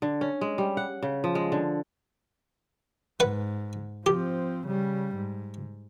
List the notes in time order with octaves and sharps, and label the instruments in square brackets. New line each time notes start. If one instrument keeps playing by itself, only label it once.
[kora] D3
C#4
G#3
G3
F#5
C#3
F3
G#3
D3
[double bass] G#2 [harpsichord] B4 F#5
[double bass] F3 C4 [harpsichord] G4
[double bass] C#3 G3
G#2